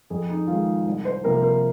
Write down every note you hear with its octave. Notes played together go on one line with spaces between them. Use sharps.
F2 G#4
D#4
D#3 G#3 F4
C2
C5
C3 F3 A#3 A#4
A#4